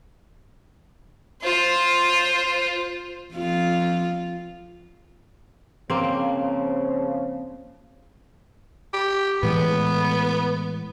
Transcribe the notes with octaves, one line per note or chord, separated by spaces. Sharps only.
F4 C5
F2 F4
C#3 F3 A#3 C4
G4
A2 E3 G#3 B3